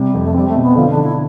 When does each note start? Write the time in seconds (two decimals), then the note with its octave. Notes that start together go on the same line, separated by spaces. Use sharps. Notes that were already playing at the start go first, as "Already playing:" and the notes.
Already playing: C3 G3
0.14 F2
0.25 A3
0.34 G3 C4
0.48 A3
0.55 B2
0.62 B3
0.75 D3 F3
0.90 D4
0.96 D3
1.03 E4